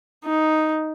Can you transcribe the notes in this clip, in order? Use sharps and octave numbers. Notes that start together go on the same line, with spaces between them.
D#4